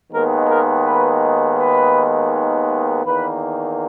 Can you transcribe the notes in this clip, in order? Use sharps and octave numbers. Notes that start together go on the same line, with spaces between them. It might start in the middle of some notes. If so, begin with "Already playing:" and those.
D#2 D#3 G#3 B3 A#4
A#4
B4
B4
E2 D#3 A#3 B4